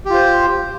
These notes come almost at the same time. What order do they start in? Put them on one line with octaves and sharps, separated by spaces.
G4 F4 C5